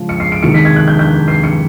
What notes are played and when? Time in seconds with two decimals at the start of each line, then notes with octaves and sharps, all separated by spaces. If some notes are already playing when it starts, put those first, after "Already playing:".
Already playing: C#3 F3 G#3
0.09 C#7
0.20 C7
0.32 D7
0.43 C3 D#3 G#3 C#7
0.54 B6
0.65 G#6
0.76 F#6
0.88 G6
0.99 G6
1.28 C7
1.44 C#7